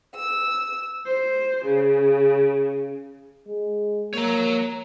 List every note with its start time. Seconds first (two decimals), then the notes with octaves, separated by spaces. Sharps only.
0.14 E6
1.06 C5
1.65 C#3
3.47 G#3
4.14 A#3 C#5 A#5